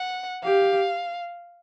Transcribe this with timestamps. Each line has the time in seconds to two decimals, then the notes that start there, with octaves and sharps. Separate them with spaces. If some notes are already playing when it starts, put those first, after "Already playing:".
Already playing: F#5
0.43 G4 F5